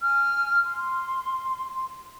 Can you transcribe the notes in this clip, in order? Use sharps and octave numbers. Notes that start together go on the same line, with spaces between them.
G#5 F6
C6